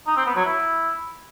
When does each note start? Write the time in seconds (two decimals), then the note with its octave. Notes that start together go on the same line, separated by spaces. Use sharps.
0.07 D#4
0.17 C4
0.26 B3
0.36 F#3
0.45 E4